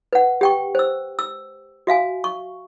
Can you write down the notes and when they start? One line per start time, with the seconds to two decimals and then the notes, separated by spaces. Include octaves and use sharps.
0.13 B4 F#5
0.41 G4 G5 C#6
0.75 C5 E6
1.19 E6
1.87 F#4 E5 F5 G#5
2.24 C#6